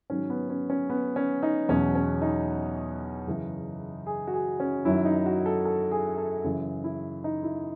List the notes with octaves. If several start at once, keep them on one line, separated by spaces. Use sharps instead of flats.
G#2 D#3 F#3 C#4
B3
C#4
C#4
B3
C#4
D#4
E2 B2 F#3 C#4
C#4
D#4
F#2 C#3 E3
G#4
F#4
G#4
C#4
F#2 D#3 F#3 E4
D#4
F#4
A4
A4
G#4
A4
F#2 C#3 E3 G#4
E4
D#4
E4